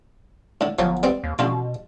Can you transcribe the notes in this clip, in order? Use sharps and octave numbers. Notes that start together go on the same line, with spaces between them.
A2 D3
G1 F3 F#3
G3 B3 C4
D#2
A1 B2 D3 F4